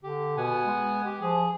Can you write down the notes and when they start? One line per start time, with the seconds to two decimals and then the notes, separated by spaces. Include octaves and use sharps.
0.03 D3 G4
0.37 B2 B3 F#5 G#5
0.65 G#3
1.05 G4
1.21 F3 G#4